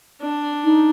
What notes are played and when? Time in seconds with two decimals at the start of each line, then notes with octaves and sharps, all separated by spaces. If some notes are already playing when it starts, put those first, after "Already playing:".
0.22 D4
0.64 D#4